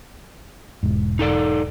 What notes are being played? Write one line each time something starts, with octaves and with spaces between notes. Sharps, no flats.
E1 G#2
D#4 A4 D5